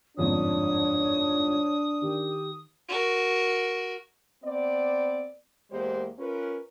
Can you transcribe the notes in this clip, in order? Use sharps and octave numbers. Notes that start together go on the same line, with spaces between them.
G1 F2 G#2 D4 C#5 D#6
D#3 G4
F#4 A#4
B3 C4 D5
E2 G#3 A#3 G4 C5
C#4 F4 A#4 B4